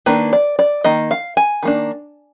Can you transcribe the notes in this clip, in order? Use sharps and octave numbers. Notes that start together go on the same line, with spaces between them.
D#3 A#3 D4 B4
D5
D5
D#3 A#3 D#5
F5
G#5
D#3 A#3 D4